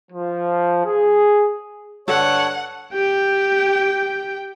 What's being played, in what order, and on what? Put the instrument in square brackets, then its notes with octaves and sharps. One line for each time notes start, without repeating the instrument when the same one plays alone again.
[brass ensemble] F3
G#4
[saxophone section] G2 D3 [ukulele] A4 [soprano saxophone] C#5 [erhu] F#5
[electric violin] G4 G5